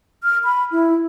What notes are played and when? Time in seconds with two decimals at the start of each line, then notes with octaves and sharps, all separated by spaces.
0.23 F6
0.44 B5
0.72 E4